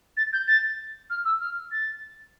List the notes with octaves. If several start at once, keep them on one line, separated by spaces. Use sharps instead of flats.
A6
G6
A6
F6
E6
F6
A6